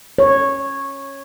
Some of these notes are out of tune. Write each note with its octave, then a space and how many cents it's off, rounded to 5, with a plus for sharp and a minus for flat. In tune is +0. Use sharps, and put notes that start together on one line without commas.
C#5 -10